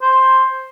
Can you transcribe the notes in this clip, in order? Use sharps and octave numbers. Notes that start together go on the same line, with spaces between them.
C5